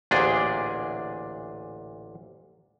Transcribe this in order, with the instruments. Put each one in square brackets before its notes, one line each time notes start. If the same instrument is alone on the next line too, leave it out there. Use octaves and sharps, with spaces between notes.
[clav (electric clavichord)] A1 D2 A#2 D4 G#4 G5